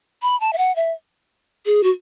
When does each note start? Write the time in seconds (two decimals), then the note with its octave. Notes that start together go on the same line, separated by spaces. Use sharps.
0.22 B5
0.40 A5
0.53 E5
0.58 F#5
0.76 E5
1.66 G#4
1.83 F#4